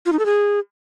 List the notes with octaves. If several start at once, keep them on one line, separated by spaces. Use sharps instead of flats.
F4
D#4
A4
G#4